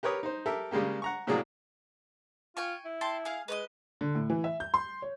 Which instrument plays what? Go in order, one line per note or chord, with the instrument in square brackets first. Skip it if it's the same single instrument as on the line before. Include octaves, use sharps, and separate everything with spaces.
[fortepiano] G4 A#4 B4 C#5 D#6
D#4 C5
G4 A4 A#4 E5
C#3 G3 G#3 A#3 G4
F#5 A#5 C#6
A2 C3 F#3 A#3 G#4 D5
[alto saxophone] F4 [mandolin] G5 G#5 C#6
[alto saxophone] E4
[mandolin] G5 A5 C6
G#4 F5
[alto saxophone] G#3 [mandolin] B4 C#5 D#5
[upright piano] D3
A2
E3
E5
G6
C6
C#5